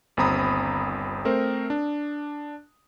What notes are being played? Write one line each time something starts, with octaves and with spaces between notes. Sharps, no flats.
G1 D#2 C4 A#5 B5 D#6
A3 C4 A#4 C5
D4